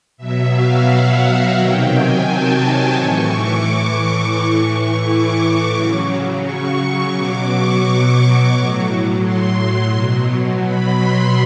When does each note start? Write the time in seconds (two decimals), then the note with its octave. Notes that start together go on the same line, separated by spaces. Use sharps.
0.17 B2 F#3 E5
0.52 F5
0.87 F#5
1.22 F#5
1.57 C3 D#3 F#3 G5
1.91 G#5
2.26 A5
2.96 A2 E3 C#6
3.31 D6
3.66 C#6
4.35 A2 E3 C#6
5.04 D6
5.74 C#3 F#3
6.44 C#6
6.78 C#6
7.13 B2 F#3 D6
7.48 C#6
8.52 A2 F#3
9.22 C6
9.92 B2 F#3
10.62 B5
10.96 C6